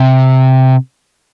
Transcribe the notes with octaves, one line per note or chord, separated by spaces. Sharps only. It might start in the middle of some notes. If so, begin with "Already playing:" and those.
Already playing: C3